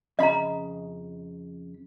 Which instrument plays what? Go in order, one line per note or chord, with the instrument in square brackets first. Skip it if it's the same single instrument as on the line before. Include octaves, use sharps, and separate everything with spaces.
[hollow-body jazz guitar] F2 C#3 B5 [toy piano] D#5 A#5